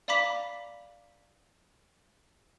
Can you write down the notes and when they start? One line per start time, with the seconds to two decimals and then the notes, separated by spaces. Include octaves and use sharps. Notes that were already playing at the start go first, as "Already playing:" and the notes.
0.08 D5 F5 A#5 B5 D6 B6